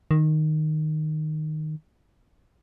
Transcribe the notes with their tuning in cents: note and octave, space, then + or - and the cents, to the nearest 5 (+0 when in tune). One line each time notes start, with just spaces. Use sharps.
D#3 -10